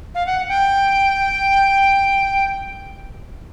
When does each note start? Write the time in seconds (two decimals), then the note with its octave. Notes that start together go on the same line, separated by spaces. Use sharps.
0.15 F5
0.26 F#5
0.49 G5